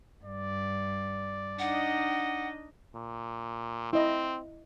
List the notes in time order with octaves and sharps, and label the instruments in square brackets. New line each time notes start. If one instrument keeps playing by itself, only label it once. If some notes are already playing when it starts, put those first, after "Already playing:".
[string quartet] G2 [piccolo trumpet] D5
[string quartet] D4 D#4 D#5 [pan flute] F#5
[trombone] A#2
[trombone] C4 [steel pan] E4 D#5